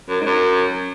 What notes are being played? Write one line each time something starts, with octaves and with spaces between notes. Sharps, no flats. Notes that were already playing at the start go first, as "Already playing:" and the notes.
F#2
G#2
F#2